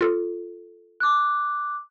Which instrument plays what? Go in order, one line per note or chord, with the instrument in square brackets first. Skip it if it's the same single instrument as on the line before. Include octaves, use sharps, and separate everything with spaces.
[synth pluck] F4 A4
[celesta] D6 F#6